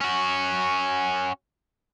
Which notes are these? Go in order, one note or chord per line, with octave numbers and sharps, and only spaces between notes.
C#4 F#4